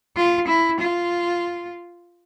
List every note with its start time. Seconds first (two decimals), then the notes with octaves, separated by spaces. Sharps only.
0.17 F4
0.48 E4
0.81 F4